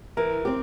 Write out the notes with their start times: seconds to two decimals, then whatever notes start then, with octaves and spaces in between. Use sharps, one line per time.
0.17 E3 A#4
0.45 C4 G4